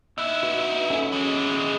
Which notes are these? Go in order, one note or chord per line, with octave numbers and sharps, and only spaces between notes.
D#4 E4 E6 F#6
F#4 B4 D#5
C#4 F#4 A4
E3 G#3